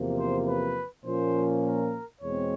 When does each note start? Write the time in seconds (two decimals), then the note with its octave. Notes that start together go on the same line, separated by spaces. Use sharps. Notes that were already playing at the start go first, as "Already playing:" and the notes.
Already playing: E2 C3 F3 A#3
0.18 C5
0.48 B4
1.05 A#2 F3 A#3 C#4 C5
1.64 A#4
2.22 E2 B2 G#3 C4 C#5